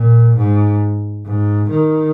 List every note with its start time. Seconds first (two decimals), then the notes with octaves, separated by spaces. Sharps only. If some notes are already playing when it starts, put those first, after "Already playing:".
Already playing: A#2
0.37 G#2
1.25 G#2
1.70 D#3